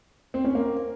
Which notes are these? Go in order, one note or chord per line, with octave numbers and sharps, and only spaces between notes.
C4
C#4
A#3